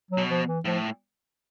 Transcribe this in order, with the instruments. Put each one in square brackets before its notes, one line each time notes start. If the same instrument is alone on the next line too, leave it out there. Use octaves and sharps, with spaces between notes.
[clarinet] F#3
[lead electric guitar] B2
[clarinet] F3
E3
[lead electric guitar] A2 [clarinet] F3